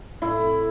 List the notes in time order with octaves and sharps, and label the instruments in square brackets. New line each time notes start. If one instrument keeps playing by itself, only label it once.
[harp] A2 [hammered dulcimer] E4
[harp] C4